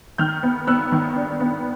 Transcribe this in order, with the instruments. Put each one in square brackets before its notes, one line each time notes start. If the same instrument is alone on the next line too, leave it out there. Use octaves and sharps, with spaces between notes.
[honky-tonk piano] D#3 F6 G6
B3
B3 E6 F#6
D#3
D4
B3